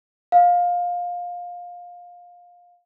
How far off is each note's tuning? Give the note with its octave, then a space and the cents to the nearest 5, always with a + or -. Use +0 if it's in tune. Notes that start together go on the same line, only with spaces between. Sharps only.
F5 +20